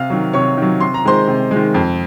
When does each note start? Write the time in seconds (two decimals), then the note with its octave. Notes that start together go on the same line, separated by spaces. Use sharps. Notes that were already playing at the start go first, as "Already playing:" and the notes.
Already playing: C3 F5 F6
0.10 D#3 F#3
0.33 C3 C#5 C#6
0.57 D#3 F#3
0.80 C3 C6
0.94 A#5
1.04 D#3 G#3 C5 C6
1.27 C3
1.51 D#3 G#3
1.74 F2